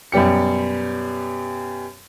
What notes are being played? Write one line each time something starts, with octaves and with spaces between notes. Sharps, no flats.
F#2 B2 G3 G4 C#7